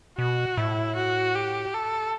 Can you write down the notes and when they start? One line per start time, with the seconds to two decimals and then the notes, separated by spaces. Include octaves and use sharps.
0.18 B2 F#4
0.58 A2 E4
0.96 F#4
1.35 G4
1.74 A4